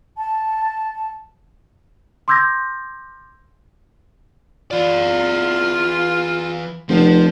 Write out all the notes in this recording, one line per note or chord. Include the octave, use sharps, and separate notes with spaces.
A5
C6 D6 E6 G6 G#6 A#6
E2 E3 F4 D5
F1 F3 D4 C5